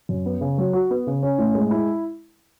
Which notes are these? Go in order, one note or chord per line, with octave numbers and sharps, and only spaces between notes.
F#2
B3
C#3
F#3
F#4
B3
C#3
C#4
A2
G#3
E4